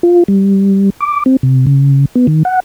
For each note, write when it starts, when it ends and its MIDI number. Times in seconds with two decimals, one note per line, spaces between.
0.03 0.24 65
0.28 0.90 55
1.00 1.23 86
1.26 1.36 60
1.43 1.66 48
1.67 2.05 49
2.15 2.27 59
2.27 2.43 51
2.45 2.60 78